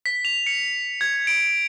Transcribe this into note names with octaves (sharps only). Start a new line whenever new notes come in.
B6
F7
C#7
G#6
D7